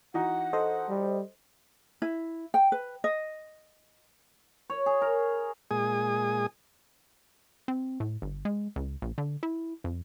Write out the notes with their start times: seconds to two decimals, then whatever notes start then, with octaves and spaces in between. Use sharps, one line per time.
0.14 E3 D#4 F#4 F#5
0.53 A4 C5 D#5
0.89 G3
2.02 E4
2.54 G5
2.72 B4
3.04 D#5
4.70 C#5
4.86 G#4
5.02 A#4
5.71 A#2 G#3 G#4 G#5 D#6
7.68 C4
8.00 A2
8.22 G1
8.45 G#3
8.76 C#2
9.02 A#1
9.18 D3
9.43 E4
9.84 F2